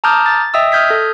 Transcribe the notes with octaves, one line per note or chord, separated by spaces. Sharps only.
A5 A#5 D6 D#6 F6 G6
A6
D#5 E5 G5 D#6 E6
D#6 F6 G6 G#6 B6
A4